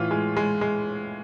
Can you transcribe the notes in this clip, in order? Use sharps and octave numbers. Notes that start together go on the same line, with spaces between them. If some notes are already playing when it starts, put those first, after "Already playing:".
Already playing: A2 E3 F4
G#3
G#3
G#3